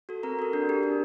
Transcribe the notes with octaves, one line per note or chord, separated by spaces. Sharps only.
F#4 A4
C4 A#4 A#5
F#4 A4
D4
G4
D4